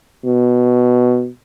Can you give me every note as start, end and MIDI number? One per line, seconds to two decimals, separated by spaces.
0.24 1.28 47